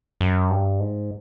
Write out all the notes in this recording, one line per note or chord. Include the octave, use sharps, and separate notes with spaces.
F#2
G2
G#2